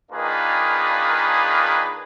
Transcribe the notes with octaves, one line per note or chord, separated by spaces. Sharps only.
D#3 A#3 D4 F4 G#4 B4